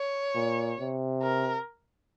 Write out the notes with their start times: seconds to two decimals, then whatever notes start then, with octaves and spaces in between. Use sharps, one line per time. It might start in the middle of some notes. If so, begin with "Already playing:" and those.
Already playing: C#5
0.35 A#2
0.79 C3
1.22 A#4